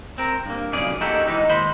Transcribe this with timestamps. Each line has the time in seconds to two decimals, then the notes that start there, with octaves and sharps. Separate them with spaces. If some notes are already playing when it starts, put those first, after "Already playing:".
0.18 C4 A#4
0.46 G2 A#3
0.73 B1 F2 C#3 G#4 D5
1.01 A#3 D#4 E4 F#4 G4 A4
1.28 E3 G#3 D#4
1.49 D#2 G#3 C5 B5